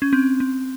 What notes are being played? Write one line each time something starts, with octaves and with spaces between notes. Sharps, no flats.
C#4
C4
C4